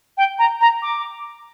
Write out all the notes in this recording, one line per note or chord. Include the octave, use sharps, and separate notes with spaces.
G5
A#5
A#5
D6